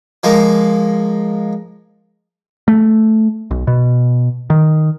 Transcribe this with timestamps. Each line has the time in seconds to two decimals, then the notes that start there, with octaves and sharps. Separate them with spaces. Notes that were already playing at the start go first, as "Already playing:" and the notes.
0.23 F3 G#3 A#3
2.68 A3
3.51 B1
3.67 B2
4.50 D#3